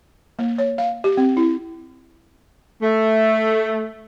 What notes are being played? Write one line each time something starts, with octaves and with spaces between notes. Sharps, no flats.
A#3
C#5
F5
G4
C4
E4
A3